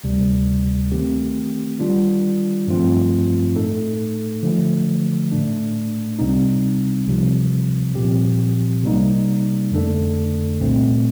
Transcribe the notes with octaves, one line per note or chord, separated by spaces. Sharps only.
D2 C3 G3
D#3 A3 C4 G4
D#3 G3 D4 F4
G2 F3 A3 C4 F4
A2 A3 D#4 A4
D3 F3 A3
A2 A3 D4
C2 C3 G3 C4 D#4
C2 C3 F3
C2 A#2 F3 C4 G4
C3 G3 A#3 D#4
F2 D3 A3 D4 A4
C2 A#2 A3 C4